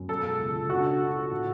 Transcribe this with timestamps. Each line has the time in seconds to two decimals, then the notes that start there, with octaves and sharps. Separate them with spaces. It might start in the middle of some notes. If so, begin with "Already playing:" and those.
Already playing: F#2
0.09 B2 A4
0.25 G#3
0.39 C#2
0.55 C#2
0.70 D4 F#4
0.85 D4
1.00 D4
1.16 F#4
1.31 A2